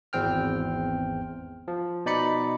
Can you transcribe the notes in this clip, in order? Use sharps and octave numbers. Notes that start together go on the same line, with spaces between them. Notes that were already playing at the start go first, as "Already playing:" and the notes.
G#1 E2 C4 G5 F6
F3
B2 D#4 D5 B5 C#7